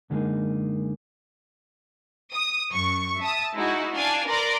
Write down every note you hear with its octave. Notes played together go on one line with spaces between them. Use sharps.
F#2 D3 G3 G#3 A#3 D#4
D#6
F#2 C#6
E5 A5 D#6
G#3 D#4 E4 F#4
D4 D5 F5 G#5
A#4 B4 D5 A#5 C6 D6